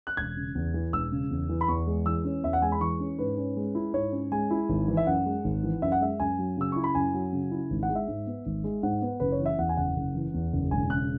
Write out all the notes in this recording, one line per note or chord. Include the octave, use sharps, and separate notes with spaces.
F#6
E1 G#6
C#3
E2
E3
E1 E6
C#3
E2
E3
B5
E2 C#6
G#3
E3 E6
C#4
E2 E5
F#5
G#3 G#5
B5
E3 C#6
C#4
G#2 B4
C#4
G#3
E4
G#2 C#5
C#4
G#3 G#5
E4
G#1
E3
E5
F#2 F#5
G#3
G#1
E3
F#2 E5
F#5
G#3 E5
F#2 G#5
F#3
C#3 E6
E4 C#6
B5
F#2 G#5
F#3
C#3
E4
G#1
F#5
G#3
E5
G#2
B3
G#1
G#3
G#2 F#5
B3
F#1 B4
C#5
E3
E5
E2 F#5
G#5
F#1 F#5
F#1
E3
E2
F#1
E1 G#5
C#3 F#6